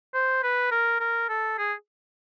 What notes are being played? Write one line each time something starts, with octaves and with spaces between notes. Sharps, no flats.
C5
B4
A#4
A#4
A4
G#4